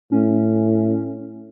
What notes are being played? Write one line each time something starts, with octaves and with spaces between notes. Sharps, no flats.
A2 C#4